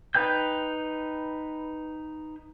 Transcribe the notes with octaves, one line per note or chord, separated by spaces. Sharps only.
D#4 B4 G5 G6